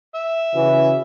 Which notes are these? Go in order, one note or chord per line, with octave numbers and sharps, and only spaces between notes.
E5
C#3 E3 C#4 F#4